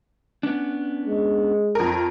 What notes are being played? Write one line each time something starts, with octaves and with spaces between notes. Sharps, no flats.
B3 C#4 D4
G#3
F2 A#4